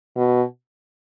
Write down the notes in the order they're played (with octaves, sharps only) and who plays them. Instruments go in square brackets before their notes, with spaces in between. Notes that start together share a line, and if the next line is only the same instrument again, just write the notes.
[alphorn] B2